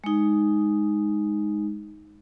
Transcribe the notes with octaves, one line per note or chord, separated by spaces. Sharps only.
G#3 D#4